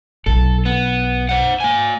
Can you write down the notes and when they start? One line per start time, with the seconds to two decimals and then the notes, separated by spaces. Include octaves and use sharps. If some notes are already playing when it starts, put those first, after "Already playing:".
0.26 B1 A4
0.65 B3
1.29 C5 F#5
1.60 A#3 G#5